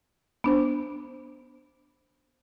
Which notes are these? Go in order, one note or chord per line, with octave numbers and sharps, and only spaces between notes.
B3 D4 C5